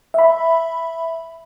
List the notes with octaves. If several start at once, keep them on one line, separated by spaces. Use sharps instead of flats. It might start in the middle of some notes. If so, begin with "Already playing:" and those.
E5 B5